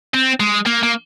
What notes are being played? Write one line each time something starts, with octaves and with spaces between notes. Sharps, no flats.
C4
G#3
A#3
A#3